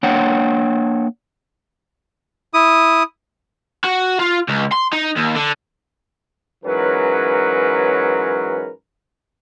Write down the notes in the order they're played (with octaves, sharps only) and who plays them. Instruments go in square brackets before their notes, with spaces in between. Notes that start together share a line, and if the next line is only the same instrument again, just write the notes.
[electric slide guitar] A#3 D4 C#5 F#5 G5
[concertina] E4 D#6
[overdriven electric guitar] F#4
F4
C#2
C6
D#4
D#2
D3
[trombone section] G#2 E3 F#3 C#4 A#4 B4